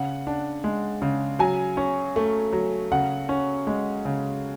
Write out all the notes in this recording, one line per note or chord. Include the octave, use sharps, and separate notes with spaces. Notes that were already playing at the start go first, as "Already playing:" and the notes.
Already playing: C#3 F#5
D4
G#3
C#3
F#3 G#5
C#4
A3
F#3
C#3 F#5
C#4
G#3
C#3